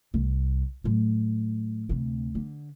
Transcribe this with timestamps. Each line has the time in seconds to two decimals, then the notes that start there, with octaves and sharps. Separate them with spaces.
0.14 C2
0.84 A2 F#3
1.89 D2 C3
2.35 D3